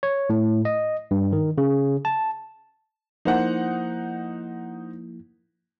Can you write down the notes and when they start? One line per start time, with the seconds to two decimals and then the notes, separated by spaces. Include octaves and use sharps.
0.03 C#5
0.30 A2
0.65 D#5
1.11 G2
1.33 D#3
1.58 C#3
2.05 A5
3.25 F3 A#3 D#4 E4 C5 F#5